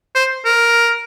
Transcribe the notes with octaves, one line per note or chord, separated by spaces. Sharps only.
C5
A#4